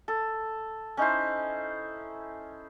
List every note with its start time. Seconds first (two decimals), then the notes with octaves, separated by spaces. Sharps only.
0.08 A4
0.97 C#4 D#4 E4 C5